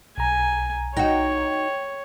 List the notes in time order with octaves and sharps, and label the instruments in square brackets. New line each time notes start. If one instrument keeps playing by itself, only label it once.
[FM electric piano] B1 A#5 [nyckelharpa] G#5
[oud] D#4 F#4 [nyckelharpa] C#5 [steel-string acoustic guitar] G5